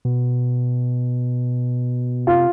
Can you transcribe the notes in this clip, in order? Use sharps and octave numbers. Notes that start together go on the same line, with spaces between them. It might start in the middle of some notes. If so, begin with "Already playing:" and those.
B2
C3 F4